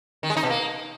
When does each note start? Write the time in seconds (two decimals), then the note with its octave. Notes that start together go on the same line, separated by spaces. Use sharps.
0.23 D#3
0.30 G#3
0.37 D#4
0.43 B2
0.50 A#3